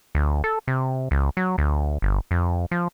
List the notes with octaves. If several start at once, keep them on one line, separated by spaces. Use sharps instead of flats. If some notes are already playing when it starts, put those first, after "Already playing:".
D2
A4
C3
C#2
F#3
D2
G1
F2
F3